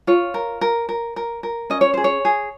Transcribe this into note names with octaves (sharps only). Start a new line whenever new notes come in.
F4 C#5
A#4
A#4
A#4
A#4
A#4
C#4 D#5
C#5
G#4 C5
C#5
G#4